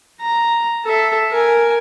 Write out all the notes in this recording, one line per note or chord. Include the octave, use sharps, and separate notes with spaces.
A#5
A4 E5
A#4 G#5